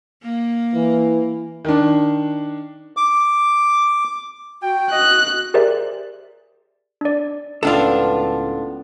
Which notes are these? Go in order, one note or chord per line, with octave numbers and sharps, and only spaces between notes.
A#3
E3
D#3 D4
D6
F#4 G5
D#5 F#6
G4 G#4 A#4 C5 D5 E5
D4 D5
C#2 A2 B3 D4 F4 A4 D5